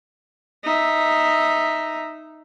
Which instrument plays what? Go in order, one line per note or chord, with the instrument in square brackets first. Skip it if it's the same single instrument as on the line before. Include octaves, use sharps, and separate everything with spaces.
[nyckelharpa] D#4 E5